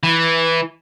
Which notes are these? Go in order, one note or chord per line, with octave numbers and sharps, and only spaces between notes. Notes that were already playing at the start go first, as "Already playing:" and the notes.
E3